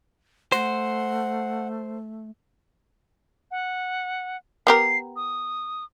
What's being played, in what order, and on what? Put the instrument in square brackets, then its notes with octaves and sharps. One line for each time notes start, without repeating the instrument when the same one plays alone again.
[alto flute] A3 [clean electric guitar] C5 [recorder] F#5
[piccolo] F#5
[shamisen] B3 G4 A#4 [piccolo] C7
[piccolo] D#6